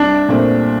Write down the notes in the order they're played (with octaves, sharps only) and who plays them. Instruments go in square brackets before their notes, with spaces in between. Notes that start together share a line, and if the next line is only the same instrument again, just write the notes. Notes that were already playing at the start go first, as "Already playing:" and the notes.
Already playing: [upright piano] C2 [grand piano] D4
[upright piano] A#2 A3 C4